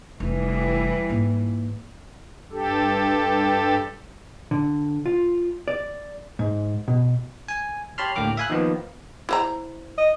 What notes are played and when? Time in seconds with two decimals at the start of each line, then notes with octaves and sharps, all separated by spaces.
0.20 F1 E3 G3
1.09 G#2 A#3
2.51 G2 G4 A4
4.51 D3
5.06 F4
5.68 D5
6.39 G#2
6.88 B2
7.48 G#5
7.98 G4 C#5 A5 B5 C6 F6
8.16 D2 A2 A#3 G4 D6 F6
8.37 E5 F5 G#5 B5 F#6
8.50 D#3 F3 A#3 B3
9.29 E4 C5 A#5
9.98 D#5